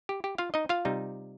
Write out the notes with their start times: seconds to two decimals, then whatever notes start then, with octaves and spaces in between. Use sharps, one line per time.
0.09 G4
0.24 G4
0.38 F4 F5
0.54 D#4 D#5
0.69 F4 F5
0.85 C3 G3 D#4